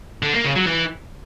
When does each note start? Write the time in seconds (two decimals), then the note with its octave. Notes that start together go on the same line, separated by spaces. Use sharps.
0.22 D3
0.33 A#3
0.44 C#3
0.56 F#3
0.67 E3